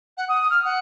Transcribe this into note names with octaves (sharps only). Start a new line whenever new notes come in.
F#5
D#6
F6
F#5